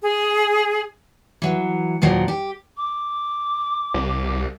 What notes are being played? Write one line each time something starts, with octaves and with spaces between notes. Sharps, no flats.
G#4
E3 F#3
D#2 A#2 F3 F#3
G4
D6
C2